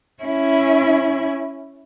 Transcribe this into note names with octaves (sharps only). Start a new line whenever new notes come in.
C#4 E4